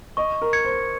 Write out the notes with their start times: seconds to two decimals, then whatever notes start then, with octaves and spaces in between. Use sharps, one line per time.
0.17 D#5 C#6
0.42 A#4
0.53 G#6 C#7
0.65 C5